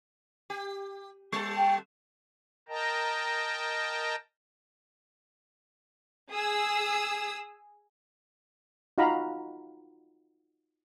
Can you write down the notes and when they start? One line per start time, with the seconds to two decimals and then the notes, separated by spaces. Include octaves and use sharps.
0.50 G4
1.32 G3 A4
1.58 G5
2.69 A#4 D#5 G5 A5 A#5
6.30 G#4 D#6 E6
8.98 D#4 F4 F#4 F5 A#5 B5